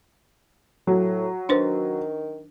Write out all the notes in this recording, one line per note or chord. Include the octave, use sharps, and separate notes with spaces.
A2 F#3
D#3 D4 B4 C5